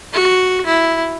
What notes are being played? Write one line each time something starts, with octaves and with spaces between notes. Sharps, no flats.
F#4
E4